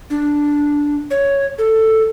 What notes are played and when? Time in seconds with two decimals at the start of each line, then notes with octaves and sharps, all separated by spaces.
0.10 D4
1.11 C#5
1.58 A4